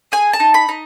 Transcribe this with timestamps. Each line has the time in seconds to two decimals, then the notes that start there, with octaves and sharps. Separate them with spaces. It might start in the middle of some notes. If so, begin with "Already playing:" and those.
0.12 G#4 G#5
0.33 A5
0.40 D#4
0.54 B5
0.69 D#4